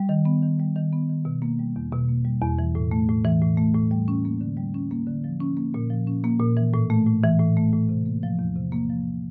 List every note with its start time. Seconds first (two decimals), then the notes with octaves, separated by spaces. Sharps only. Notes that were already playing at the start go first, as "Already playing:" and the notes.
Already playing: G3
0.09 D#3
0.25 B3
0.42 D#3
0.59 G3
0.76 D#3
0.93 B3
1.09 D#3
1.25 B2
1.42 A#3
1.59 G3
1.76 E2
1.92 B2
2.09 A#3
2.25 G3
2.42 E2
2.59 E3
2.75 A2
2.91 A3
3.08 A2
3.24 E3
3.41 A2
3.57 A3
3.75 A2
3.91 G3
4.08 C#4
4.25 A#3
4.41 D3
4.57 G3
4.74 C#4
4.91 A#3
5.07 D3
5.24 F3
5.40 C#4
5.57 A#3
5.74 A#2
5.90 F3
6.07 C#4
6.24 A#3
6.40 A#2
6.57 E3
6.74 A2
6.90 A3
7.07 A2
7.24 E3
7.40 A2
7.57 A3
7.73 A2
7.89 C3
8.06 A#3
8.23 F3
8.39 E2
8.56 C3
8.72 A#3
8.90 F3